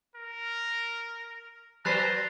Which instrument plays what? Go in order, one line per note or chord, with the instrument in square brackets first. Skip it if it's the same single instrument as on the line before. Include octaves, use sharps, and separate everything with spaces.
[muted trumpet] A#4
[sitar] F#3 B4 C5 [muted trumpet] A#5 [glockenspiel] F#6 A6 C7